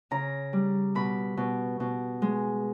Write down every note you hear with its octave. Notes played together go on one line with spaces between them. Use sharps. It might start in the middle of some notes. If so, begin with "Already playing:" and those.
C#3 A#5
G3
B2 B5
B2
B2
G#3